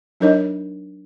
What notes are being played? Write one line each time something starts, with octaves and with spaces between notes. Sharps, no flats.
F#3 D4 D#4 A#4 C#5 D#5